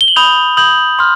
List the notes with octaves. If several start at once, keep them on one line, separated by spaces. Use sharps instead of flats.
G7
F#7
B5 D#6 G6 F7
B5 D#6 G6 F#7
C6 F6